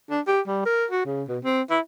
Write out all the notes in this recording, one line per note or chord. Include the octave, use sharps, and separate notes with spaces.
D4
G4
G3
A#4
F#4
C#3
B2
C4
E4